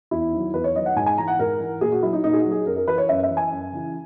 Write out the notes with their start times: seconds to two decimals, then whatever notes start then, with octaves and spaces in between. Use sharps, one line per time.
0.11 E2 E4
0.33 D#3 F#3
0.54 E2 B4
0.64 C#5
0.75 D#3 F#3 D#5
0.86 F#5
0.96 G#2 G#5
1.06 G#5
1.18 E3 A#5
1.28 F#5
1.39 G#2 A#4
1.60 E3
1.81 A#2 G#4
1.92 F#4
2.02 F#3 E4
2.13 D#4
2.24 A#2 D#4
2.33 G#4
2.38 F#4
2.45 F#3
2.52 G#4
2.66 F#2 A#4
2.76 A#4
2.87 E3 B4
2.98 C#5
3.09 F#2 E5
3.23 E5
3.30 E3
3.37 G#5
3.51 F#2
3.73 C#3 E3